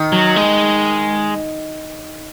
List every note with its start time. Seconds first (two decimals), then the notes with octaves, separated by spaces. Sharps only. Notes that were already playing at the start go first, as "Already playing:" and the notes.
Already playing: D#3
0.12 F#3
0.36 G#3